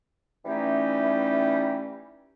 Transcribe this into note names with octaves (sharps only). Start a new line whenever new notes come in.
E3 G3 A3 C#4 D#4 G4